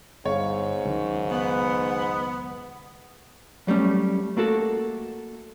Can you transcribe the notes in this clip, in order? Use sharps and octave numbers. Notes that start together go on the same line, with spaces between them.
G1 G#2 C#5 F5
C#2 F#2 D#3
B3
F#3 G3 A3 C#4
A3 A#3 F#4 A4